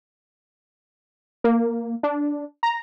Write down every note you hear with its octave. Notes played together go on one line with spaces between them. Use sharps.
A#3
D4
A#5